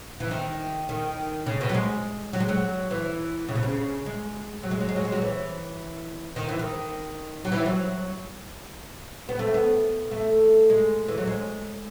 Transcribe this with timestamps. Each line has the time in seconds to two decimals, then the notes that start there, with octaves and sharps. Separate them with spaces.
0.20 E3
0.31 D#3
0.89 D#3
1.46 C#3
1.61 B2
1.69 F#3
1.74 G#3
2.33 F#3
2.40 G#3
2.49 F#3
2.91 E3
3.49 C#3
3.55 B2
3.63 C#3
4.06 G#3
4.63 F#3
4.71 G#3
4.80 F#3
4.89 G#3
4.96 F#3
5.05 G#3
5.12 F#3
5.22 E3
6.36 D#3
6.49 E3
6.59 D#3
7.45 F#3
7.52 E3
7.66 F#3
9.29 B3
9.39 A3
9.54 B3
10.11 A3
10.70 G#3
11.08 E3
11.18 F#3
11.27 G#3